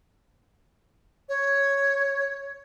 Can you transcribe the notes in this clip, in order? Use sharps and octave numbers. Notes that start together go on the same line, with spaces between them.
C#5